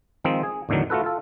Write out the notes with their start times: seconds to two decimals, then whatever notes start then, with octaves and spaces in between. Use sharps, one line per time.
0.24 D#3 F3 G#3 C4 D#4
0.43 G#4
0.69 E2 A2 D3 D#3 F#3
0.90 A3 F4 F#4 A4 B4
1.04 F4 A4